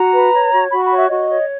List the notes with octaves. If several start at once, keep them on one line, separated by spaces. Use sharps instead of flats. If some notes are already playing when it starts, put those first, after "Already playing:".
Already playing: F#4 A#5
B4
C#5
F#4
F#4 B5
B5
C#5
E5
F#4 D#5
C#5